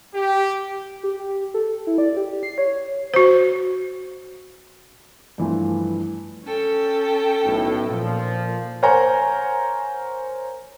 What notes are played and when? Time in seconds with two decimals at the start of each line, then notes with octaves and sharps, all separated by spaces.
0.15 G4
1.04 G4
1.20 G4
1.54 A4
1.87 E4
1.98 D5
2.17 G4
2.43 C7
2.58 C#5
3.14 F#4 C5
5.38 G2 E3 F3 A3
6.44 C#4 A4 G5
7.45 B1 A2
7.89 A#2 F3
8.83 A#4 C5 C#5 F#5 G#5 A#5